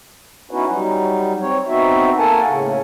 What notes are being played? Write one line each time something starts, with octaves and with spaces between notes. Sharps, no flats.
B3 C#4 D#4 E4 F#4 B4
F#3 G3 D#4
C4 C#5
B3 C4 D#4 F#4 E5
A#3 A4 A#4 F#5 G#5 A5
A2 C#3